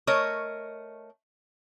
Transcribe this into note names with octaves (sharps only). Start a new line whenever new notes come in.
A3 A#4 C#5 D#5